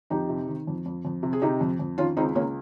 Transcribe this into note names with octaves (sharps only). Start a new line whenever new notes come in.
F2 D#4 G4
C3
D#3
F2
F2
F2
C3
G#4
C3 D#4 G4
F2
F2
D#3 C#4 F4
C#2 C4 D#4
C#2 A#3 C#4